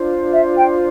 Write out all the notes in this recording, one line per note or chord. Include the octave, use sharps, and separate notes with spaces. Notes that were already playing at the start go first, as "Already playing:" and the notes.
Already playing: D4 F4 C5
E5
G5